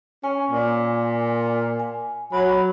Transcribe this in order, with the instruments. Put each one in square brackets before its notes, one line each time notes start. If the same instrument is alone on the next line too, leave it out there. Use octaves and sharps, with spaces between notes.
[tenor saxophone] C#4 [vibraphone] G#5
[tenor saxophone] A#2
[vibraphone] G#5
[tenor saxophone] F#3 [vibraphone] B5